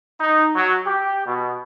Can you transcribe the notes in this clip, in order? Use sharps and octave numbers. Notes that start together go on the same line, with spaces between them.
D#4
F#3
G4
B2